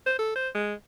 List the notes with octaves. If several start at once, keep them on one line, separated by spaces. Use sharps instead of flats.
C5
A4
C5
G#3